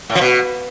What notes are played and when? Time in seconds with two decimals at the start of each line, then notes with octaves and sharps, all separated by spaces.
0.10 A2
0.15 F3
0.21 B2